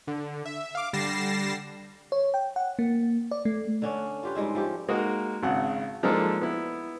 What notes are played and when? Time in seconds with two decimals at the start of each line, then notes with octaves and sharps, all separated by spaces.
0.07 D3
0.45 E5
0.75 F5 D6
0.93 D3 G3 A6 A#6 C7 E7
2.12 C#5
2.34 G5
2.56 F#5
2.79 A#3
3.31 D5
3.45 A3
3.82 D3 C#4 D4
4.23 F4 G4 B4
4.35 G#2 G3 G#3 E4
4.55 F3 A3 G4
4.89 G#3 A#3 D#4 F#4 A#4
5.43 G#1 C#3 F#5
6.03 F3 G#3 A#3 D4 D#4 A4
6.41 B3 E4